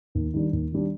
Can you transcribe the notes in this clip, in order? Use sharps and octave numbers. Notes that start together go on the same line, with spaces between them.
D#2
D#3 G3 D4
D#2
D#3 G3 D4